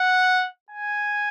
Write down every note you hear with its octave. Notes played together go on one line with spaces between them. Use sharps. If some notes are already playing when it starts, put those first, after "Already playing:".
Already playing: F#5
G#5